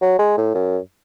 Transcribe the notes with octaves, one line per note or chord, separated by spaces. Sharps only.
F#3
G#3
A2
F#2